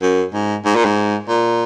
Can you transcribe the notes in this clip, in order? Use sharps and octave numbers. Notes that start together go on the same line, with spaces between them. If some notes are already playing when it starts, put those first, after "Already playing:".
F#2
G#2
G#2
A#2
G#2
A#2